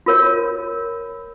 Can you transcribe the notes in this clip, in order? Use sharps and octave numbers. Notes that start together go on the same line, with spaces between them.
F4 A#4 C#5